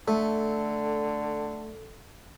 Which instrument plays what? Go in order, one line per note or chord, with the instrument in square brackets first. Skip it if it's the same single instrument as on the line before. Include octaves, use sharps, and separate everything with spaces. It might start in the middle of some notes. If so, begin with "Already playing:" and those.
[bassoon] D3 [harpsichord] A3 [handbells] A4